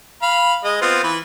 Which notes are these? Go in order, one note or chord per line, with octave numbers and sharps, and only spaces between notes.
F5 B5
G#3 D#5
B3 C4 F4
E3 B4